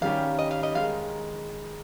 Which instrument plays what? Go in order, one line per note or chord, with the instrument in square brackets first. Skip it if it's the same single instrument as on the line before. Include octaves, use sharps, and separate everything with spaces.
[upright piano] D#3 G3 C#4 G4 [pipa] F5
[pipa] D#5
F5
D#5
[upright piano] D#3 G#3 D#4 [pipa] F5